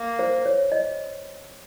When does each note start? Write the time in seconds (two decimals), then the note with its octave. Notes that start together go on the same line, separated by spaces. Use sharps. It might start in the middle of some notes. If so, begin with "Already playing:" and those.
Already playing: A#3
0.19 C5
0.46 C#5
0.72 D#5